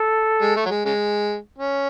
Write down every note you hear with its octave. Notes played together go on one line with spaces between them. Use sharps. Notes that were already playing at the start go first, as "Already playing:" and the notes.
Already playing: A4
G#3
A3
F#3
G#3
C#3 G#3
C#4